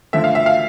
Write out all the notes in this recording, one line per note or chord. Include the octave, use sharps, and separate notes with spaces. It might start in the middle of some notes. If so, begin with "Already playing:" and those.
D3 F3 A3 E5
F5
E5
F5